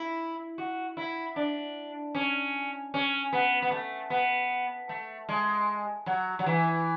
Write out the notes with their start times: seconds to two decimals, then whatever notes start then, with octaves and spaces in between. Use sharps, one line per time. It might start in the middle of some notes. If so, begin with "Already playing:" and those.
Already playing: E4
0.58 F#4
0.97 E4
1.36 D4
2.15 C#4
2.94 C#4
3.33 B3
3.62 B3
3.71 A3
4.10 B3
4.89 A3
5.29 G#3
6.06 F#3
6.39 F#3
6.46 E3